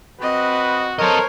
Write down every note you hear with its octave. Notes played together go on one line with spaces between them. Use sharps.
C4 F#4 B4 D#5
A4 A#4 C5 C#5 D#5